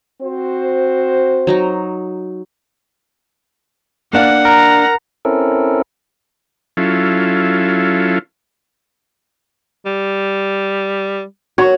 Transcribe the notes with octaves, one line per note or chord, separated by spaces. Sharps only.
C4 F#4 C5
F#3 D#4 A#5
A#3 D4 F5 F#5
A#4 A#5
C4 C#4 E4 A4 A#4
F#3 C#4 E4 F4 A4
G3
F#4 C#5